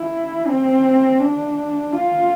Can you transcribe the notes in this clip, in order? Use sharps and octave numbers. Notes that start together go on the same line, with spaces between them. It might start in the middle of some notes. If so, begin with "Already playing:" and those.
Already playing: E4
C4
D4
F4